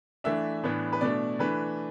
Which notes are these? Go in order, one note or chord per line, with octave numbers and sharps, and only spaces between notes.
E3 A3 D4 E5
A2 E3 B3 D4
B4
B2 A3 D4 D5
E3 A3 D4 B4